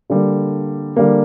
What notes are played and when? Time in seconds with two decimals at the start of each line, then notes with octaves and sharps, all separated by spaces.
0.10 D3 G3 A#3
0.96 D3 G3 A#3